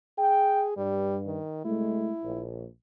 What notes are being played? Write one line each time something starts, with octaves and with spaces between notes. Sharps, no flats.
G#4 G5
G2 G3
D#3
C2 G#3 A3 E4
A#1